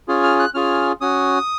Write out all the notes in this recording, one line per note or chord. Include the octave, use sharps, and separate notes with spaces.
C#4 F4 G#4
F6
F#6
C#4 F4 G#4 F6
C#4 F#4 D#6